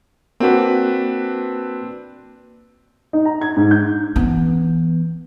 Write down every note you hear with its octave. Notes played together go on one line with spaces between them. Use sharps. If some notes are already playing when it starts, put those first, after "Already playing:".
A#3 C4 D4 F#4 B4
D#4
A#5
G#6
G#2
G6
E3 B3